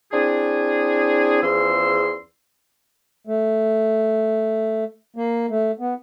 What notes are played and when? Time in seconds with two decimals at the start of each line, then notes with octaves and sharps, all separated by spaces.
0.13 C4 D4 E4 G#4
1.42 E2 F3 C#4 G#4 C6 E6
3.27 A3
5.16 A#3
5.50 A3
5.80 B3